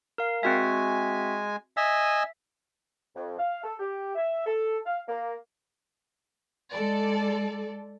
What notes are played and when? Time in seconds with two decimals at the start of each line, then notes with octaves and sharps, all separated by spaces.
0.18 A#4 F5
0.43 G#3 C4 F#4 E5 G#5
1.77 D#5 E5 G#5 E6
3.15 F2
3.38 F5
3.64 A4
3.79 G4
4.15 E5
4.46 A4
4.85 F5
5.08 A#3
6.73 G#3 A4 D5